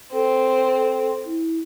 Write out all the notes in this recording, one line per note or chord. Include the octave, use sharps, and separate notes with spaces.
C4 A4
E4